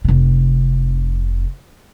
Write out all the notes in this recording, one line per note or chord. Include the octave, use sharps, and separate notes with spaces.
F1 C3